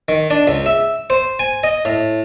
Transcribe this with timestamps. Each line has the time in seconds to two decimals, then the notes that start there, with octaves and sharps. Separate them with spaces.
0.08 D#3
0.30 D4
0.48 C#2
0.66 E5
1.10 C5
1.39 G#5
1.64 D#5
1.85 A2